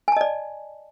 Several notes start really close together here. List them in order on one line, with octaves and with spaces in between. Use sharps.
G#5 A5 D#5 D5